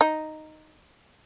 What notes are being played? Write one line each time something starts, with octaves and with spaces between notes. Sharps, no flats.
D#4